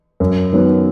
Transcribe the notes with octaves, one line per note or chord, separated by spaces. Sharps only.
F#2
D#3 F#3 B3